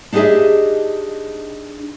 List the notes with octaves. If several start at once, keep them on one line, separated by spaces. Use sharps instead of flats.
D4 D#4 G4 G#4 D#5 E5